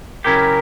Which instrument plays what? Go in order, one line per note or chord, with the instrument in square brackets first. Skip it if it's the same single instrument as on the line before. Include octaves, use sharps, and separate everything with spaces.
[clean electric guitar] C#3 F#3 C#4 E4 G4 [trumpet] A#4